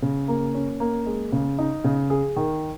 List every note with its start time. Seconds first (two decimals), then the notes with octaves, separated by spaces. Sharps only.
0.02 C#3
0.28 A#3
0.54 C#4
0.80 A#3
1.06 G#3
1.32 C#3
1.59 D#4
1.84 C#3
2.10 G#4
2.36 D#3